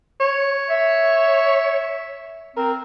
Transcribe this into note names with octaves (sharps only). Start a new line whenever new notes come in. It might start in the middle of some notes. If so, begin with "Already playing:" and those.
C#5
E5
C4 A#4